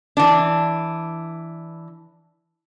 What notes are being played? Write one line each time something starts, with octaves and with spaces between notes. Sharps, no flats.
E3 D4